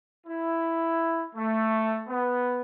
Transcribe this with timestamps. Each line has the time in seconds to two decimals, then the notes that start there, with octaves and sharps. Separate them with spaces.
0.27 E4
1.35 A3
2.07 B3